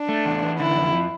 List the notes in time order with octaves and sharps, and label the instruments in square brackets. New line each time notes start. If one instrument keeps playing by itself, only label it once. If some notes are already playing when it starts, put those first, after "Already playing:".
Already playing: [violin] D4
[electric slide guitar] A3
E2
E3
[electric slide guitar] D3 [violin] E4
[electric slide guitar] F2
F3